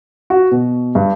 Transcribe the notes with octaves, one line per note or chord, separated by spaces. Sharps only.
F#4
B2
G2